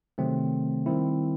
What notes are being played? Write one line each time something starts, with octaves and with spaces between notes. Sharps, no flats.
C3 D#3 F#3 A3 C4
D#3 G3 C4 E4